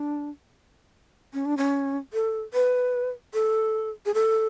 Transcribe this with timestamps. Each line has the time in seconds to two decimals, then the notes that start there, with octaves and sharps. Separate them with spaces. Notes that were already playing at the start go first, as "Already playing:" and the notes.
Already playing: D4
1.34 C#4
1.46 D4
1.57 C#4
2.13 A4
2.54 B4
3.34 A4
4.06 G#4
4.14 A4